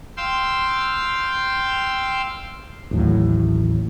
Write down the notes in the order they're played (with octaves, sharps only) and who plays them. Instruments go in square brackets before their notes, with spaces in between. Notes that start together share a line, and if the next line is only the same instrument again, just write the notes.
[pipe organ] F5 G5 C6 E6
[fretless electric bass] A1 D#2 A2 F#3